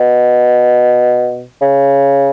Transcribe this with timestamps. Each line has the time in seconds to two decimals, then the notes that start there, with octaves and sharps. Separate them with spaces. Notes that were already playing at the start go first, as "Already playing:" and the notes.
Already playing: B2
1.62 C#3